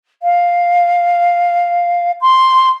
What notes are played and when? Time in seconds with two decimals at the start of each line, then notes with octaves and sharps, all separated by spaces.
0.22 F5
2.21 C6